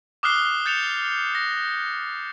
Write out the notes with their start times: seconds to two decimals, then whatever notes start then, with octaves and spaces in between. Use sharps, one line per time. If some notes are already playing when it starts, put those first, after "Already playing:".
0.23 D6 D#6 F6 F#6 C7 G7
0.66 G6 A6 C#7 E7 F7
1.35 A#6